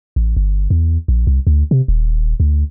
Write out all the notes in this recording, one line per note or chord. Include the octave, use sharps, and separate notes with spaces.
A1
G1
E2
A#1
C2
D2
C3
D#1
D2